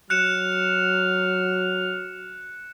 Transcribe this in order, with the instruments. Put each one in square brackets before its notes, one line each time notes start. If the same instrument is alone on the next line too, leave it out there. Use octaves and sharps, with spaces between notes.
[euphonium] F#3 [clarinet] F6 [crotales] F#6 C#7 E7